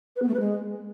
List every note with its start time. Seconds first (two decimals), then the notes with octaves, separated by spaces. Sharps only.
0.16 B4
0.22 B3
0.28 A3
0.34 B4
0.40 G#3